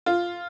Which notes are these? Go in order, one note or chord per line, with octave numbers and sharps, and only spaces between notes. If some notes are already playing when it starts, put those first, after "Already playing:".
F4